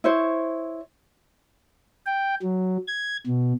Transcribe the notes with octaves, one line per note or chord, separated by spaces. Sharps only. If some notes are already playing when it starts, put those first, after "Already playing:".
E4 C5 C#5
G5
F#3
G#6
B2